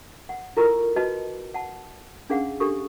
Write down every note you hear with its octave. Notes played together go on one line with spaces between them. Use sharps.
F#5
E4 F4 A4 A#4 A#5 C#6
F#4 B4 D#5 A5
F#5 A5
C#4 D4 G#4 C5 F5 F#5
D4 G4 A4 C#6 D#6